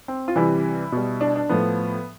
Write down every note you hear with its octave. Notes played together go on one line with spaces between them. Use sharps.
C4
F4
C3 E3 G3 E4
B2 G3
D4
D4
A2 F3 B3